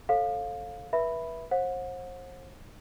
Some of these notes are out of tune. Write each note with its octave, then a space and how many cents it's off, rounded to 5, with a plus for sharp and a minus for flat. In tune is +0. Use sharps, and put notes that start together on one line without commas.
A4 +0 C#5 -45 F5 +15
B4 -25 E5 +0 B5 +0
C5 +35 F#5 -35